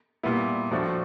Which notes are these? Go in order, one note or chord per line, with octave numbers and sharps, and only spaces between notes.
A#2 G3 B3 E4
A2 F3 A3 D4 F#4